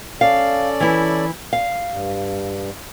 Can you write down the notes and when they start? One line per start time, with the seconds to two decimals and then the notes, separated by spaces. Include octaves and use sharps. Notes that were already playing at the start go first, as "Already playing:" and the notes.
0.21 C#4 A4 D5 F5
0.80 E3 E4
1.53 F5
1.90 G2